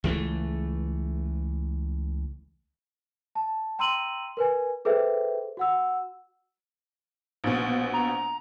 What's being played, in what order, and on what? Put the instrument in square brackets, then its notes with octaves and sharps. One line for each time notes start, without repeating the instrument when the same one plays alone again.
[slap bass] C#2 E3 F3 A3
[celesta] A5
G5 A#5 C6 E6 D#7 F#7
A#4 B4 G#5
G#4 A4 B4 C5 E5 G5
F#4 F#5 E6
[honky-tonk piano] A#1 B2
[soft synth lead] A#5